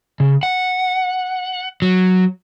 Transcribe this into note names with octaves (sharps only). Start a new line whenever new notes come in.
C#3
F#5
F#3